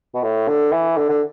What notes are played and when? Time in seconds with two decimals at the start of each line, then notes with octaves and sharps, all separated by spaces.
0.14 B2
0.23 A2
0.48 D3
0.72 E3
0.97 D3
1.09 D3